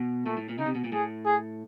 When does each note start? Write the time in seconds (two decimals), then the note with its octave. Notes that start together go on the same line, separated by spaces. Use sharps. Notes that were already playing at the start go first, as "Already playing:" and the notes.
Already playing: B2
0.25 A#2 A3
0.37 A2
0.49 A#2
0.58 C#3 D#4
0.66 C3
0.75 B2
0.84 A#2
0.92 A2 G#4
1.26 G#4